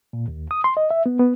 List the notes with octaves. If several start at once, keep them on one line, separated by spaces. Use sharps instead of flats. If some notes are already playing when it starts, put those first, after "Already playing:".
A#2
D#2
D#6
C6
D#5
E5
B3
B3